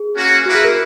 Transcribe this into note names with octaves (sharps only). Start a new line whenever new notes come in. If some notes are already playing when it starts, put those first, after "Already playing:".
Already playing: G#4
A#3 C#4 F#4
A#3 E4 F#4 B4
G#4
A#4